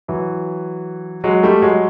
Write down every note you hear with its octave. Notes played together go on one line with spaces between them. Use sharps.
E3 F#3
F#3 G#3
G3 A3
F#3 G#3